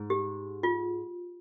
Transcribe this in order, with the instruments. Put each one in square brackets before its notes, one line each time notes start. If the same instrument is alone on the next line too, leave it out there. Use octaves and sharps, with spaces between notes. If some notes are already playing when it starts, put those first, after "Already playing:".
Already playing: [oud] G#2
[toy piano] G4
F4